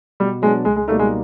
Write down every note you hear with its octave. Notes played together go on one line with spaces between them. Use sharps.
B2 G3
F#3 G#3 B3 D4
C#2 G#3
G#3
B2 G3 A3 A#3 D#4
G#3